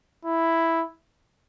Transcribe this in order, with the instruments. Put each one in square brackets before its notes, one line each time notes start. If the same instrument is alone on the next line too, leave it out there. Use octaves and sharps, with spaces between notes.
[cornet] E4